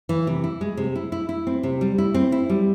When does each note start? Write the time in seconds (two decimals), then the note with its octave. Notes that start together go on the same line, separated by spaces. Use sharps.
0.09 E3
0.27 C3
0.44 E4
0.61 G#3
0.77 C3
0.96 E4
1.12 E4
1.29 E4
1.47 C4
1.63 C3
1.81 G3
1.98 E4
2.14 C4
2.32 E4
2.49 G3